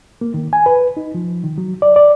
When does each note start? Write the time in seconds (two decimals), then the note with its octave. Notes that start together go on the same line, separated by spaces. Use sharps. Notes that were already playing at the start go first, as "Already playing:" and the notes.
0.21 A#3
0.34 D#3
0.53 G#5
0.66 B4
0.97 D#4
1.15 F3
1.44 D#3
1.58 F#3
1.82 D5
1.96 D5